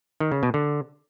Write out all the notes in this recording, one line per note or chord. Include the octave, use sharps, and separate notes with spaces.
D#3
C#3
B2
D3